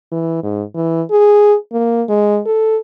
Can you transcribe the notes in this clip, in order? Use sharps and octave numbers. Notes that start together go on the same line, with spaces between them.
E3
G#2
E3
G#4
A#3
G#3
A4